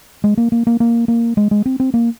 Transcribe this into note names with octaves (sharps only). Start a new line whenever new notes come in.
G#3
A#3
A#3
A#3
A#3
A#3
G#3
G#3
C4
C4
A#3